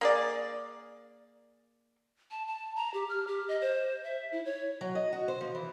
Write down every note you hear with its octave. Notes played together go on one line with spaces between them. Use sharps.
A#3 G#4 D5
A5
A5
A#5
G4
F6
G4
D#5
C5
E5
E4
C#5
F#3
D#5
F#4
C5
F3
E3